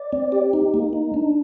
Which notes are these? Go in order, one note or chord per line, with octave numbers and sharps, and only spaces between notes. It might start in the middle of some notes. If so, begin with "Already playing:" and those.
Already playing: D5
C4
G4
D#4
A#3
D#4
D4